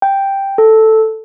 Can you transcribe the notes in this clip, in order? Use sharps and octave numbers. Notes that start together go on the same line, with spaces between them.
G5
A4